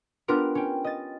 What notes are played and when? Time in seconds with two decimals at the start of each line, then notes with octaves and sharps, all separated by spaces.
0.28 B3 D4 F4 G4 A#4
0.55 C#4 G5
0.84 D#5 A6